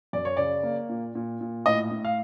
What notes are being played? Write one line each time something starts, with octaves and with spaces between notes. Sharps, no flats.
F#2 D5
C#5
C#3 D5
A#3
A#2
A#2
A#2
A2 D#5
A2
F5